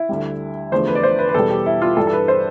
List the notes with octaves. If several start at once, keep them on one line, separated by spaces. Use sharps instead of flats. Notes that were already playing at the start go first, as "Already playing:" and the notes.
Already playing: E4
D2 D3 G3
E2 D3 F3 A3 C5
B4
D5
C5
B4
B4
E2 B2 G3 A4
G4
E4
F4
G2 E3 G3 A4
A4
B4
C5